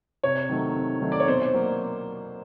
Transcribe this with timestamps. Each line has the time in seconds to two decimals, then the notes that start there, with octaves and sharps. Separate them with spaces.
0.23 C3 C#5
0.49 D#3 F#3 A3
0.76 C3
1.02 D#3 F#3 A3
1.12 D5
1.20 C#5
1.28 B2 C5
1.54 F#3 A#3